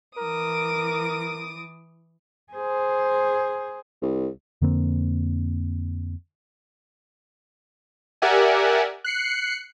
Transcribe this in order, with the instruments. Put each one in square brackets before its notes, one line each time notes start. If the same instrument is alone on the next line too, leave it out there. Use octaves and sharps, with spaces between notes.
[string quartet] E3 D6 D#6 [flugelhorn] A#4
[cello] G#4 C5
[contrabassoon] C2
[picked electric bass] F2 D3 A#3 C4
[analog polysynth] G4 A#4 D5 E5 F#5 G#5
F#6 C7 C#7